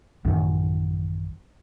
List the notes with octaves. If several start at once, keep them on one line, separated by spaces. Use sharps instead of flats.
A1 F#2 D#3